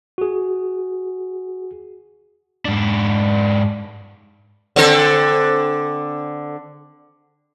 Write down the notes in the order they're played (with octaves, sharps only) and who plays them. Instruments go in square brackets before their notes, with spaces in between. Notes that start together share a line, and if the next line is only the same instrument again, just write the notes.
[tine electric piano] F#4 G#4
[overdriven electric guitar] G#2 D4
[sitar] D3 C4 A4